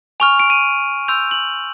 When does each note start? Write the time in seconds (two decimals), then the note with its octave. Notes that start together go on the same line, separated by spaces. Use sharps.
0.20 G#5 C#6 F6 F7
0.39 D7
0.50 D#7
1.08 C6 E6 G6 F7
1.31 F#7